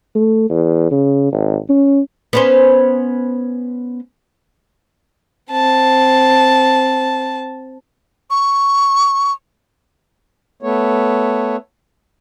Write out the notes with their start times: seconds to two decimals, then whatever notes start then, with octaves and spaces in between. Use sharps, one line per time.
0.15 A3
0.50 E2
0.91 C#3
1.32 G#1
1.69 C#4
2.33 B3 C#4 C5
5.51 C4 A5
8.30 C#6
10.63 A3 B3 C#5